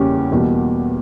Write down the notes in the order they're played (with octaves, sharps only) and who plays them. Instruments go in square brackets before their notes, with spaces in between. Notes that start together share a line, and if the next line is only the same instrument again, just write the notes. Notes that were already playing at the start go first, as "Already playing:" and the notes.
Already playing: [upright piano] E2 C#3 G3 A#3 C#4 G4
E2 B2 G3 A#3